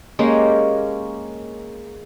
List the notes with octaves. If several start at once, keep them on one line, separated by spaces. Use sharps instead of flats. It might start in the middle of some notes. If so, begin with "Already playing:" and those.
G#3 A#3 C#4 G4